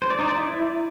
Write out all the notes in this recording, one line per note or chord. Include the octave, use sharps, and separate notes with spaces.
C5
D5
D#4
D5
E4